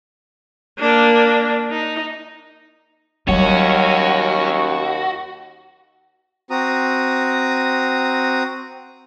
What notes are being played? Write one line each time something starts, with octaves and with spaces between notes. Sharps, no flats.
A#3 D4
D#4
D#2 F#3 G3 C#4 F#4
C4 F#4 A#5 D#6